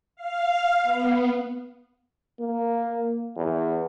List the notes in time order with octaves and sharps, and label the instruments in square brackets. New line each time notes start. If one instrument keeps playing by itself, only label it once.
[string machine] F5
B3
[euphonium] A#3
E2